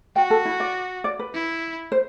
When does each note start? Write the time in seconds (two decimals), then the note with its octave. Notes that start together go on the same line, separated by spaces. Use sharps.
0.16 F#4 G5
0.30 A4
0.45 E4
0.60 D5
1.04 D5
1.19 B4
1.34 E4
1.92 C5